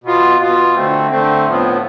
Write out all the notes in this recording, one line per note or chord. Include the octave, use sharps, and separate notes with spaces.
B2 B3 F4
B2 B3 F4
D3 A3 C4
D3 A3 C4
A2 F3 B3